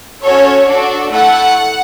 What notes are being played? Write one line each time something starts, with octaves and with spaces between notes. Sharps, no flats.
C#4 F#4 A4 C#5
D4 F#4 A4
A3 E4 A4 F#5